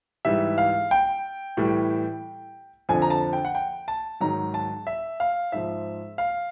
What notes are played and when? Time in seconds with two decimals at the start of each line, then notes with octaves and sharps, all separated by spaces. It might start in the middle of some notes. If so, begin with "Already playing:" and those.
0.25 G#2 E3 G3 E5
0.58 F5
0.91 G5
1.57 A2 E3 G3
2.89 F2 D3 F3 G#5
3.02 A#5
3.10 A5
3.33 G5
3.45 F#5
3.55 G5
3.88 A5
4.21 G#2 D#3 F#3 A#5
4.54 A5
4.87 E5
5.20 F5
5.52 G#2 F3 E5
6.18 F5